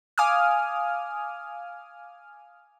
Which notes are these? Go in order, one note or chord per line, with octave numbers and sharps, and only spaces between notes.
F5 G#5 D6 D#6 F6